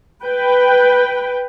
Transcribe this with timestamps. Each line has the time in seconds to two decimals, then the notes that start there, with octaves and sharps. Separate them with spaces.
0.23 B4 G5